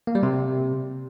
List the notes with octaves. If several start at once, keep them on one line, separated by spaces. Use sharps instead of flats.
A#3
G3
C3